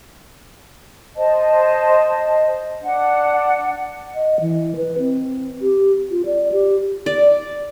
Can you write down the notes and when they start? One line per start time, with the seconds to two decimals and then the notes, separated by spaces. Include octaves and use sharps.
1.16 C5 D#5 A5
2.81 D4 F#5
4.14 D#5
4.41 E3
4.76 B4
4.99 C4
5.62 G4
6.11 F4
6.26 D5
6.52 G4
7.06 D5